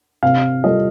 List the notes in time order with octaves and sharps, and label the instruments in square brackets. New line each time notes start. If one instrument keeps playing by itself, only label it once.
[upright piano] C3 [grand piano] F5
[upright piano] G3 C4 F4 A4 [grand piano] D#5